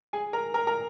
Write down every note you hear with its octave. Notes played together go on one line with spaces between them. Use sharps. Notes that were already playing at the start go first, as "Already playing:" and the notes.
G#4 G#5
A#4 A#5
A#4 A#5
A#4 A#5